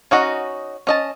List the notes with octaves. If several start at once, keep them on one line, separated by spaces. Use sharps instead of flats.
C#4 D#4 F#4 D#5
C#4 D#5 A5